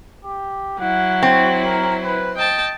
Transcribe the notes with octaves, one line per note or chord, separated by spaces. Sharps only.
G4
F#3 E4 F#5
C4 F#4
A#4
B4
D#5 G5 A5